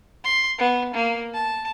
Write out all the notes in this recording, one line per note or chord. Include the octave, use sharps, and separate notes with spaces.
C6
B3
A#3
A5